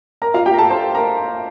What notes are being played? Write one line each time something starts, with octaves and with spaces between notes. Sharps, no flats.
A#4 A#5
F4 F5
G4 G5
A#5
A4 A5
C5 C6
A#4 A#5